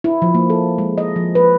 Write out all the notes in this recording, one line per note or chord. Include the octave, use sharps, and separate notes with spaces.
E4
F3
A#3
A4
G#3
D#5
F3
B4